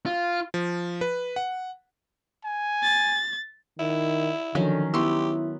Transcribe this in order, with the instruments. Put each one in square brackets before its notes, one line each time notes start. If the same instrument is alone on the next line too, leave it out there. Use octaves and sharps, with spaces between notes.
[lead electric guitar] F4
[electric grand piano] F3
B4
F#5
[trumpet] G#5
[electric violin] A6
[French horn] D#3 [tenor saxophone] E4
[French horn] D3 [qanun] D#3 F#3 C#4 [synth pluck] F3
[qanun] B3 [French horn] E4 [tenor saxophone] G4 [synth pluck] C6 C#6 E6